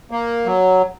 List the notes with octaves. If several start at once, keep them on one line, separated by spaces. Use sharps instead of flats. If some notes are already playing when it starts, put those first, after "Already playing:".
A#3
F#3